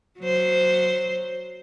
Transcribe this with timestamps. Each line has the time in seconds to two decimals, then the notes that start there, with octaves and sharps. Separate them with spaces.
0.20 F#3 C5